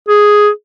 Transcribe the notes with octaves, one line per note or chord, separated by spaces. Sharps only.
G#4